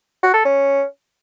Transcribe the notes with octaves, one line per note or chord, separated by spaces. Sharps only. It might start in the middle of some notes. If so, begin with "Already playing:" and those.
F#4
A4
C#4